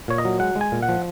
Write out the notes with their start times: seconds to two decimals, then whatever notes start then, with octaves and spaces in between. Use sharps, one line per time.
0.08 A#2 C#5
0.18 D#5
0.25 F#3
0.40 G#3 F#5
0.56 G#3
0.61 G#5
0.72 A#2
0.83 F#5
0.89 F3